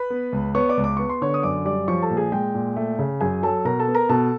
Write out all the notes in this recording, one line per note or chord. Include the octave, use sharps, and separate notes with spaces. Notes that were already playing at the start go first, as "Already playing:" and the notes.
Already playing: B4 B5
B3
C#2
B3 C#5 C#6
D5 D6
C#2
D6
B3 C#6
C6
D3 C#5 C#6
D#6
F#2 D5 D6
G3 D5 D6
F3 C#5 C#6
A4 A5
A#2
G#4 G#5
G#3 G5
A#2
A3
C#3
F#2 G#4 G#5
F#3 A4 A5
B2 A#4 A#5
A4 A5
B3
A#4 A#5
B2 A4 A5